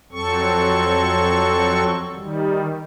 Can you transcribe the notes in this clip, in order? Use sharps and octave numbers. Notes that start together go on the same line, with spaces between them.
F2 F#3 C4 A4 C#6
D#3 G3